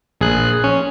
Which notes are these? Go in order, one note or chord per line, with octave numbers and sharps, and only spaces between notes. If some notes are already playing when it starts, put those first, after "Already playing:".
A#1 G#4 F#6
C#4